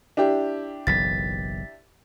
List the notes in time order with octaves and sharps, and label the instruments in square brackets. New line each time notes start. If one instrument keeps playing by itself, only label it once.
[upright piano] D4 E4 G4
[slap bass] F#1 B1 E3 [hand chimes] A6 B6